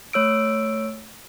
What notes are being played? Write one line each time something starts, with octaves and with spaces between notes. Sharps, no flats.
A3 C#5 E6 D7